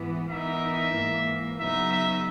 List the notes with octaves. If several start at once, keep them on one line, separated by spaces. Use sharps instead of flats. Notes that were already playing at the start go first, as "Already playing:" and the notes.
Already playing: G#2 E3 B3
E3 B3 D#4 A#4 E5
G#2 E3 A#3
C#3 F#3 B3 D#4 E5
E5